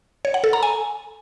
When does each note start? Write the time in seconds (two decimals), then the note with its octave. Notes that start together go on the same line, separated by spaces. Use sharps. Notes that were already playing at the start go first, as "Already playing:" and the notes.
0.25 C#5
0.34 F#5
0.44 A4
0.53 A#5
0.63 G#5